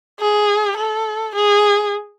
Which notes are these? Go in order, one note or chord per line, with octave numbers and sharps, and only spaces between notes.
G#4
A4
G#4